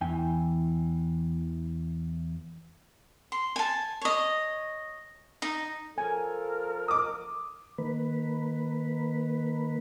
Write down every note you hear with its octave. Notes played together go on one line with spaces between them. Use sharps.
E2 E3 G5 G#5
C6
G#5 A5
C#5 D#5
D#4
F3 A4 A#4 G#5
D6 D#6
D#3 A#3 B4